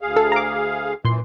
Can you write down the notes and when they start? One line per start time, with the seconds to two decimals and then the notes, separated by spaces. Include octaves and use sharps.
0.01 D2 G#4 F5
0.16 A4
0.32 A#5 D6
1.05 F#2 A#2 E3 C6